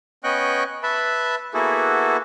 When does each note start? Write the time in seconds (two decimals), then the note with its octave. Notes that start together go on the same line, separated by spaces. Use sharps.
0.24 B3 C#4 D#5 G5 C#6 F#6
0.83 B4 E5 A5 B5
1.54 A#3 B3 E4 F#4 G#4 A4